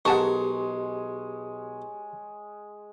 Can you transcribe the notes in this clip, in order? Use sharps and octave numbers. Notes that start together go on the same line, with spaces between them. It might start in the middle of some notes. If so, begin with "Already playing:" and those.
B1 G#3 G4 A#4 C#5 F#5 A5 C#6